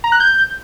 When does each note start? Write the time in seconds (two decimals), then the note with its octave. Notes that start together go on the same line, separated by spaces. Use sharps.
0.04 A#5
0.12 F#6
0.20 G6